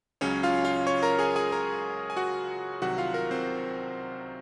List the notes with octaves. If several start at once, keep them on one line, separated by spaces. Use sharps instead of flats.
C#2 C#3 F#3 C#4 C#5
F4 F5
F4 F5
C#5 C#6
A#4 A#5
G#4 G#5
G#4 G#5
A#4 A#5
G#5
F#4 F#5
C2 C3 D#3 F#3 F#4 F#5
F4 F5
A#4
C4 C5